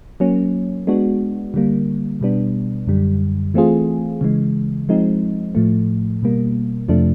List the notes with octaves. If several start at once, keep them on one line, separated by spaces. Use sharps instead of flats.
F#3 A#3 C#4
G#3 B3 D4 F#4
D3 G3 A#3
B2 G3 B3 D4
F#2 D3 G3
E3 A3 C4 F4 G#4
C#3 E3 G#3
F3 G#3 C4 D#4
A2 F3 A3
B2 G3 A#3
F2 C3 F3 A3 D4